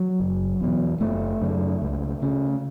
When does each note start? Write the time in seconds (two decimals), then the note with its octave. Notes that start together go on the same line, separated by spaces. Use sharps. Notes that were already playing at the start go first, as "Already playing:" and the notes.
Already playing: F#3
0.20 F#1
0.60 E2 B2
1.00 F#1 A3
1.42 F#2 C#3
1.82 C#2
2.22 C#3